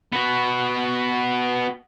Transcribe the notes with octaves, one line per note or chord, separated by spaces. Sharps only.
B3 F#4